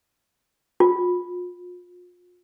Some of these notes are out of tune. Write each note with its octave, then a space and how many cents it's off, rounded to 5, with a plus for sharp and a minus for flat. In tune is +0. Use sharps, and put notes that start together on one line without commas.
F4 +35